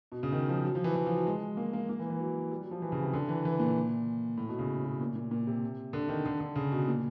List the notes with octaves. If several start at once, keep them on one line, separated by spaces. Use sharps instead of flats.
B2
C#3
D#3
F3
F#3
F3
E3
E3
F3
F#3
G#3
A#3
A#3
A#3
E3
E3
F#3
G3
F#3
F3
E3
C#3
C3
D3
E3
E3
A#2
A2
B2
C#3
B2
A#2
A#2
A#2
C3
D3
D#3
D3
D3
C#3
B2
A#2